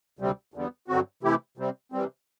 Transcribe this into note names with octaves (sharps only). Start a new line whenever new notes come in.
D2 C3 G3 C4
E2 D3 G3 B3
G2 D3 F#3 C4 F#4
C3 E3 A3 E4 G4
C3 G3 C4
C3 E3 G3 C4